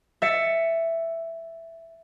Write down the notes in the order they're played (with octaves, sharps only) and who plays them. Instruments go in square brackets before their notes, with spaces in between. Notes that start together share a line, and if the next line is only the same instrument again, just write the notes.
[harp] E5 A6 C#7